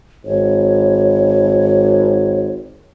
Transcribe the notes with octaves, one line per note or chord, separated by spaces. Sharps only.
G#1 C#5